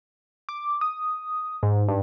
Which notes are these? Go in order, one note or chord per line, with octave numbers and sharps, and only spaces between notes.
D6
D#6
G#2
G2